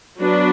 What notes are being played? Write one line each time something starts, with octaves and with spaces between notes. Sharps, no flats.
F#3 B3 D4 F#4 B4